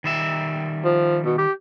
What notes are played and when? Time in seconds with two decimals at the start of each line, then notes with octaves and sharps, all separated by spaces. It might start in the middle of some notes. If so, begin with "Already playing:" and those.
0.04 D#3 G3 E5
0.84 F3
1.25 B2
1.38 G4